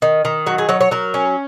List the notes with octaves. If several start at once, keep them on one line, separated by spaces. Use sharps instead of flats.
D#3
D#3
F#3 F#4
G#4
F#3 C#5
C#5
F#3 A#4
C#4